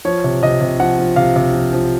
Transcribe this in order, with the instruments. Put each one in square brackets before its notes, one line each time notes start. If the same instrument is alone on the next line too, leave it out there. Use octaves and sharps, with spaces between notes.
[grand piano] F3 C#5
C3
C3 D#5
C3
F3 F#5
F3
C3 F5
C3
F3
F3